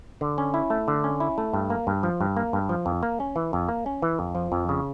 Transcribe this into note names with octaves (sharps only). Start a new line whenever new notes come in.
D3
C#4
E4
A3
D3
C#4
E4
A3
G2
A#3
G2
F3
G2
A#3
G2
F3
F2
A#3
C#4
E3
F2
A#3
C#4
E3
F2
F3
F2
C#3